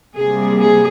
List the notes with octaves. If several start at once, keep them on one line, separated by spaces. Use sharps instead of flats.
C3 G3 A#3 G#4
G#4